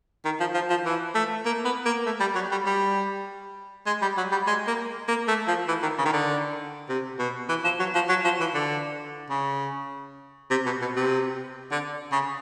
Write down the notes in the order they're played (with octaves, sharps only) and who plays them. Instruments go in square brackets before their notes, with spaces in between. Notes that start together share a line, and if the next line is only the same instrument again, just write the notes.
[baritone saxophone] D#3
F3
F3
F3
E3
A3
A#3
B3
A#3
A3
G3
F#3
G3
G3
G#3
G3
F#3
G3
G#3
A#3
A#3
A3
F3
E3
D#3
C#3
D#3
D3
C3
B2
E3
F3
F#3
F3
F#3
F3
E3
D3
C#3
C3
B2
B2
C3
D3
C#3